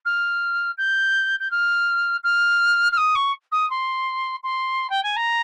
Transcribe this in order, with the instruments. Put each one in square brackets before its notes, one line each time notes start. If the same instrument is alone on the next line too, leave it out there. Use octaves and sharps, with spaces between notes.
[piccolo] F6
G6
G6
F6
F6
F6
D#6
C#6
D#6
C6
C6
G5
G#5
A#5